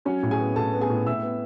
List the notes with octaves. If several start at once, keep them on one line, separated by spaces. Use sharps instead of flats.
F#3 C#4 C#5
A2
G#4 G#5
B3
A2 A4 A5
B3
G#4 G#5
A2
A2 E5 E6
B3